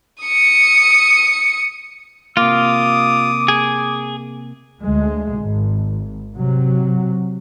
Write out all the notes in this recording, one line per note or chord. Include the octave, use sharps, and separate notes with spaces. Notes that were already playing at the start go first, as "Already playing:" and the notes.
D#6 C#7
C3 A#3 F4 D6 D#6
G#4
D2 G#3
G#1
C3 F#3